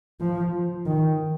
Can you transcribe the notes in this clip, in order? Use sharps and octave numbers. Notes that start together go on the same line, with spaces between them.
F3
D#3